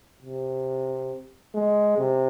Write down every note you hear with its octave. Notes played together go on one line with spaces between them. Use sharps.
C3
G#3
C3